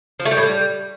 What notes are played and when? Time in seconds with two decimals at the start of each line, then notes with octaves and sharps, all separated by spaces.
0.20 F3
0.25 A3
0.31 G3
0.37 A2
0.43 G3